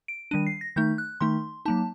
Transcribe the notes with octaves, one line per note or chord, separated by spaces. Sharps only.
D7
D#3 G3 D4 D#7
C7
A#6
D#3 A3 D#4 G6
F#6
D#3 A3 D#4 C6
F#3 A#3 D#4 A5